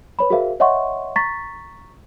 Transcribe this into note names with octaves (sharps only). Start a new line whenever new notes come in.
B4 C#5 B5
F#4 G#4 A#4 C5 E5 F5
C#5 D#5 E5 F#5 C6 C#6
A#5 C#6 A6 B6